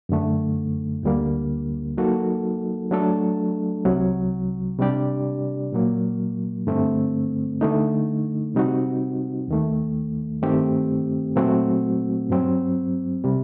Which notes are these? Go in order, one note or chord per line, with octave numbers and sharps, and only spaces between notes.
F#2 D3 A3
D2 D3 G3 A#3
F#3 A#3 D#4 F#4 A4
F#3 A3 D4 A4
C2 C3 F#3
C3 G3 D4 G4 D5
A#2 F#3 A#3
G2 D3 A3 C4
D3 A3 D#4
C3 G3 C4 D#4 F#4
D#2 D#3 A3
G2 D#3 A3 C4 G4
A#2 F#3 A3 C4 F#4
G2 F#3 C4
C3 G3